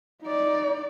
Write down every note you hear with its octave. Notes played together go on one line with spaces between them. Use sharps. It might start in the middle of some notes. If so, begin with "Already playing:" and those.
D#4 D5